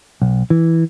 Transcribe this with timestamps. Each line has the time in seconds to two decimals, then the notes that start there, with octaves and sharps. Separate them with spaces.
0.22 B1
0.50 E3